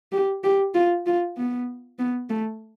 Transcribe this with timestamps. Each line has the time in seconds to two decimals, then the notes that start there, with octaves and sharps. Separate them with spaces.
0.12 G4
0.44 G4
0.74 F4
1.06 F4
1.37 B3
1.99 B3
2.30 A3